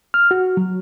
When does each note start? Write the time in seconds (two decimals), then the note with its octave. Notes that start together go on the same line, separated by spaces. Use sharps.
0.14 F6
0.31 F#4
0.57 F#3